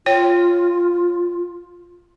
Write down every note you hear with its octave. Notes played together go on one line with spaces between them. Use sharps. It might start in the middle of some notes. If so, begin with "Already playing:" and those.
F4 C#5 G5